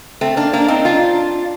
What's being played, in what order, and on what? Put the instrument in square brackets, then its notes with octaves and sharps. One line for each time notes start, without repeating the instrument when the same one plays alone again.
[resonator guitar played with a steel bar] A3 C4
A#3 D4
A#3 D4
C4 D#4
D4 F4